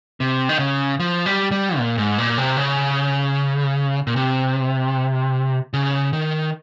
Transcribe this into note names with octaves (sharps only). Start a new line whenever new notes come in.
C3
D#3
C#3
F3
G3
G3
A#2
G#2
A#2
C3
C#3
A#2
C3
C#3
D#3